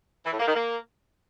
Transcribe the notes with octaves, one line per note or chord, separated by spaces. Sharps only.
E3
A2
A#3
D#3
A#3